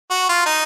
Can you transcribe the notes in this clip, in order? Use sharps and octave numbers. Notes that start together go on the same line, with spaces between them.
F#4
F4
D#4